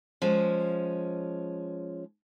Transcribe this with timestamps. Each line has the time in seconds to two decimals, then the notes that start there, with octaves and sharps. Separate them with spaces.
0.22 F3 G#3 C#4